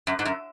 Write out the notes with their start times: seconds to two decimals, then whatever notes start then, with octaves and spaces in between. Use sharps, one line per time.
0.07 F#2
0.19 G#2
0.25 F#2